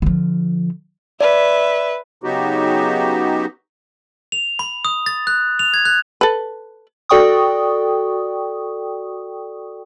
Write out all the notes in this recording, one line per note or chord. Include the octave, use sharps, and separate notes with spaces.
D3 F3
B4 D5 E5
C#3 F#3 B3 D#4 F#4 G4
F7
B5
D#6
A6
F#6
F7
G#6
F#6
A4 B4
F#4 A4 D5 G5 C#6 D#6